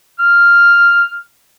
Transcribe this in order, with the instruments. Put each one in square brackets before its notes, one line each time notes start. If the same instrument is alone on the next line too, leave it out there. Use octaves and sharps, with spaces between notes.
[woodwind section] F6